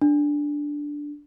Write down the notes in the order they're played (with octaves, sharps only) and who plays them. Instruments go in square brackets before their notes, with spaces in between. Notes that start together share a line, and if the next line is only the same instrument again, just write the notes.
[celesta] D4